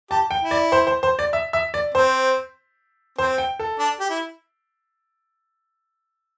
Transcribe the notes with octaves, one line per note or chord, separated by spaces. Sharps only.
G4 A5
G5
E4
D5
C5
C5
C5
D5
E5
E5
D5
C4 C5
C4 C5
G5
A4
D4
G4
E4